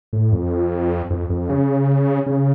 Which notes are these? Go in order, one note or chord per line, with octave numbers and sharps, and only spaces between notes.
A2
F2
F2
F2
C#3
C#3